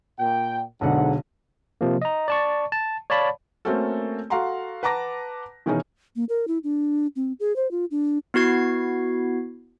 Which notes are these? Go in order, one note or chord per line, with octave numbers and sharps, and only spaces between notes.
A#2 G5
B1 G#2 D3 F#5
C3 F3 A#3
D#5 A#5
D5 A5 C#6
A5
C#5 D5 F5 A5 B5
A3 A#3 C4 C#4 F#4 A4
F#4 A4 F5 F#5 A#5 C6
B4 F#5 A5 A#5 D6 A#6
B2 D#3 E3 C#4 D#4 G#4
A#3
A#4
E4
D4
C4
G#4
C5
F4
D4
B3 E4 F#4 G#6 C7